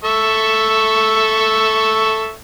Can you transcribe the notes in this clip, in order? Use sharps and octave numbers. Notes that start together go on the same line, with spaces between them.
A4 E5 C#6